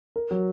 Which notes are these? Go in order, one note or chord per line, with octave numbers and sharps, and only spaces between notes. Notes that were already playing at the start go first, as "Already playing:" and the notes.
A#4
F#3